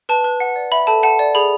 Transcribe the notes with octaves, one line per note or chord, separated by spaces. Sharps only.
B4 A5
B4
F#5
D5
E5 B5
A4 A5
F#5 A5
D5
G#4 B5